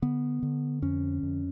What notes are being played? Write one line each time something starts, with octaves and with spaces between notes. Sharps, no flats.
D3 B3
D3
F2 C#4
F2